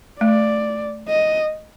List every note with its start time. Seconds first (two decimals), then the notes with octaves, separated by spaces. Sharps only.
0.21 A3 D5
1.08 D#5